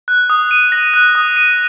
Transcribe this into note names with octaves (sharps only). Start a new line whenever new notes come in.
F#6
D#6
D#7
A#6
F#6
D#6
D#7